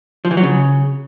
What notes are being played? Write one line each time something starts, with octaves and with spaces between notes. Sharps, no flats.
F3
E3
F#3
C#3